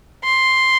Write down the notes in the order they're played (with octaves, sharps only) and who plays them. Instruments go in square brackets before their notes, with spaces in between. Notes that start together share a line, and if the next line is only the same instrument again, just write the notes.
[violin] C6